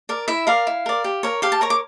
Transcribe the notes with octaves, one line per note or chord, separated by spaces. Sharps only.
A#4 D5
E4 E5
A#4 D5 F5
E4
A#4 D5
G4
A#4 C#5
G4 F5
A5
A#4 C#5 A#5
D6